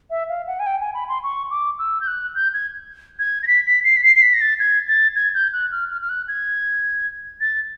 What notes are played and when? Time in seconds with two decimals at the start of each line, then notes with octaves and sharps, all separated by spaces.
0.10 E5
0.29 F5
0.47 F#5
0.59 G#5
0.66 G5
0.81 G#5
0.94 B5
1.09 C6
1.23 C#6
1.51 D6
1.79 E6
2.00 G6
2.07 F#6
2.35 G6
2.54 G#6
3.19 G#6
3.43 A#6
3.47 B6
3.66 B6
3.84 C7
3.97 B6
4.04 C7
4.16 C7
4.22 B6
4.34 A#6
4.41 A6
4.60 G#6
4.88 A6
5.16 G#6
5.35 G6
5.53 F#6
5.72 F6
5.91 F6
6.01 F6
6.09 F#6
6.28 G#6
7.41 A6